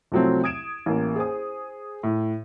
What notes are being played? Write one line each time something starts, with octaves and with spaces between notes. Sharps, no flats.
C2 F3 F#3 A3 C4
D#6 G#6 D7 E7
A1 A#3
G#4 C5 D#6
A2